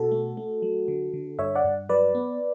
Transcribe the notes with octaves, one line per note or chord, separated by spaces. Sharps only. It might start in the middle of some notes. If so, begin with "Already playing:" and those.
Already playing: B2 F#4 A4
A3
A3
F#3
D3
D3
G2 C#5 E5
D5 F#5
G2
F#3 B4 D5
B3